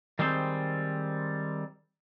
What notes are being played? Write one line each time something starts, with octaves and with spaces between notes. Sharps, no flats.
D#3 G3 G#3 C4 C5